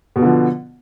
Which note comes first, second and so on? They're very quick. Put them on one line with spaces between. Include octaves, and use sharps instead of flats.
B2 B3 D3 F3